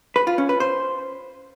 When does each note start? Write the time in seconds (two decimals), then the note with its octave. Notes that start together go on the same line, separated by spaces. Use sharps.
0.16 B4
0.27 F4
0.38 C#4
0.49 B4
0.60 C5